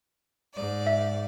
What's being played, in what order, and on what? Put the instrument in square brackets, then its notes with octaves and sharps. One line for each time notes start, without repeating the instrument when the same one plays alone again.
[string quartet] G#2 D5
[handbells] E5